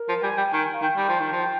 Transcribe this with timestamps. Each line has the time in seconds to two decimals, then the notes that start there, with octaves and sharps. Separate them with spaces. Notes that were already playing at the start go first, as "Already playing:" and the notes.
Already playing: A#4
0.09 F3
0.23 G3 G#5
0.37 G3 G5
0.53 D#3 G#5
0.73 F5
0.82 D#3 G5
0.97 G3
1.09 F3
1.20 D#3
1.32 F3
1.42 G5